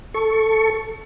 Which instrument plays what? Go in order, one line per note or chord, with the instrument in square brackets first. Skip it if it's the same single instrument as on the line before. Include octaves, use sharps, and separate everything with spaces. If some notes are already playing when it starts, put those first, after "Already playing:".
[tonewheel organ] A4 C#6